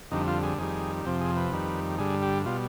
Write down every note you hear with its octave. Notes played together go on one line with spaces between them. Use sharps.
F2 D3 G3 D#4
F4
G#4
F2 D#3 G3 G#4
F2 C3 F3 G4
G#4
B4
F2 D#3 G3
G2 D3 G3 G#4
G4
B2 G3 F4